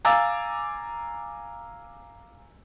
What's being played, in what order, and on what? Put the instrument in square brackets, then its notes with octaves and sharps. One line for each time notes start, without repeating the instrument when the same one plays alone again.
[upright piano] F5 G#5 A#5 D6 E6 A6